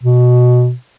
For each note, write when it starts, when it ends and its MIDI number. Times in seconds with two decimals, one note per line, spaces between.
0.03 0.72 47